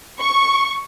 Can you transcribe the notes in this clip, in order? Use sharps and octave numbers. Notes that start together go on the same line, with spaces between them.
C#6